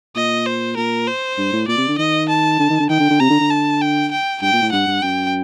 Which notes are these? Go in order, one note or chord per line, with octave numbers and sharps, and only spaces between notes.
A#2 D#5
C5
A#2 A#4
C5
G2
A2
A#2 D5
C3
D3
D#3 D#5
A5
D3
D#3
D3
D#3 G5
D3
D3
C3 A#5
D3
D3
A5
G5
G5
G2 G5
A#2
A2
G2 F#5
G2
F#2 G5